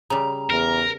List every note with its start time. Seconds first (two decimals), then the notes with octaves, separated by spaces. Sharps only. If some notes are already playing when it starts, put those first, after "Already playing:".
0.10 C#3 G3 A#5
0.50 E2 A#4